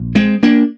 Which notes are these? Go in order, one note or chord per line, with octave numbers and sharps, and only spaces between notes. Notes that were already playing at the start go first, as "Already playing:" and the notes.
Already playing: A#1
G#3 C4
A#3 D4